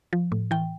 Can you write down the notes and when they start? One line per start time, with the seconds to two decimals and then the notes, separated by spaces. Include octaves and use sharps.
0.13 F3
0.32 A2
0.51 E3 G5